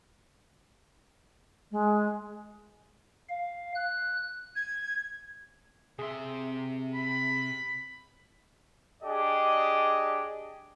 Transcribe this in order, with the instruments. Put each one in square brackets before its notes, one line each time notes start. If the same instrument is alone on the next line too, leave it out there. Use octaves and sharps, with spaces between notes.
[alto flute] G#3
[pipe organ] F5
F#6
[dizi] G#6
[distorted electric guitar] C3 C6 [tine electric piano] G#4 E5
[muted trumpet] B5
[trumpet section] D4 G4 G#4 D5 D#5